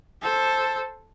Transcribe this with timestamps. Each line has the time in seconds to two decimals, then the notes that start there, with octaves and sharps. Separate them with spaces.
0.22 A4 C5